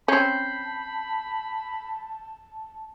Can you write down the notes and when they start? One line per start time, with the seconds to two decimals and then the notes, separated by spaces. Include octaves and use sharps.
0.08 C4 C#4 A5 B5 G6 C7